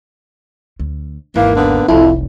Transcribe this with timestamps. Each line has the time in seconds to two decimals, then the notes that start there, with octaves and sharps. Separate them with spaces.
0.79 D2
1.36 G#1 E2 E3 A#3
1.56 D3 A#3 B3
1.88 F1 C2 F2 E4